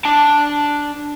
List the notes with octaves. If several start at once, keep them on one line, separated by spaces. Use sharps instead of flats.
D4 A5